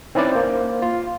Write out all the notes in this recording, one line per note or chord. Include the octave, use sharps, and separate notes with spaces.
C4 C#4 D#4 E4 B4 D5
A#3 C5
F4